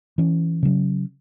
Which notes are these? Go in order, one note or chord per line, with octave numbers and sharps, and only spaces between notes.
E3 C#4
C#3 F#3 C#4